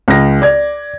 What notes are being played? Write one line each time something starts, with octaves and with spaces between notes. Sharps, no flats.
C#2 A#6
D5 G#6